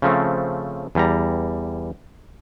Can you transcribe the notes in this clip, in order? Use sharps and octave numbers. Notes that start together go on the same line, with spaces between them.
C#3 F3 A3 C4
E2 G3 A#5